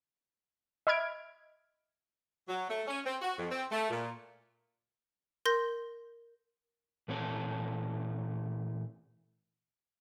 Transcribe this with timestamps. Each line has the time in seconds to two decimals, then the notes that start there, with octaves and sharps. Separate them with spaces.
0.87 D#5 E5 B5 F6 G#6 D7
2.48 F#3
2.70 A3
2.87 C#4
3.06 C4
3.22 F#4
3.39 F2
3.51 C4
3.72 A3
3.90 A#2
5.45 A#4 C6 G6 A#6
7.08 A#2 E3 A3 C4 C#5 A5